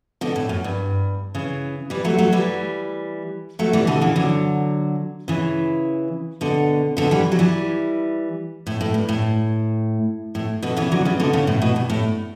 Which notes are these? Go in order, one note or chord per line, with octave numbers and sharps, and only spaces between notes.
B2 D3
A2
F#2
G2
C#3 E3
E3 G3
F#3 A3
F#3 A3
E3 G3
F#3 A3
E3 G3
B2 D3
C#3 E3
D3 F#3
C#3 E3
B2 D3
B2 D3
E3 G3
F#3
E3 G3
A2
A2
G2
A2
A2
B2 D3
C#3 E3
D3 F#3
C#3 E3
B2 D3
C#3
A2
B2
G2
A2